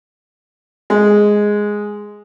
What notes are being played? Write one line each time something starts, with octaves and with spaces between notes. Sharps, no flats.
G#3